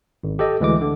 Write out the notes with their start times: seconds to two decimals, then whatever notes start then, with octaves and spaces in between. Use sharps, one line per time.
0.24 G#1
0.39 G4 A4 D#5
0.61 D2 E3 G#3 D6
0.81 D3